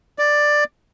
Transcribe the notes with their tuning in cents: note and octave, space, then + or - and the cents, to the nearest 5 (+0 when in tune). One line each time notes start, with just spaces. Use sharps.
D5 +10